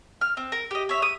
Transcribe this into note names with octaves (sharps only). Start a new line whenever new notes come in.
F6
C4
A#4
G4 D#5
C#5 E5
D#6